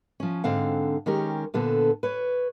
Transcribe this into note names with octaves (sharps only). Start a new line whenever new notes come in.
F3 C#4
G#2 D3 C4 F5 F#5
D#3 G#3 C#4 G4 A#4
A#2 D3 B3 A4
B4 C#5